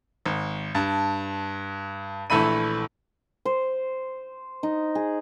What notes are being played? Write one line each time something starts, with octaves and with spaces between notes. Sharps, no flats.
G#1
G2 A5
A#1 E3 A3 E5 B5 D#7
C5
D#4
G#4